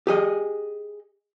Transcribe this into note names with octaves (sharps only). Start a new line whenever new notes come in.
G4 G#4 D#5